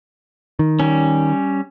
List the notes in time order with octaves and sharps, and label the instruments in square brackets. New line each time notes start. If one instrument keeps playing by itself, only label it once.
[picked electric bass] D#3
[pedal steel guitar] G3 C#4